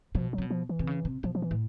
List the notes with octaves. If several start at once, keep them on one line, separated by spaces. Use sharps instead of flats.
B2 F3
F#3
C3
B2
F3
E3
C3
C#3
C3
B2 F3
F3
E3
A2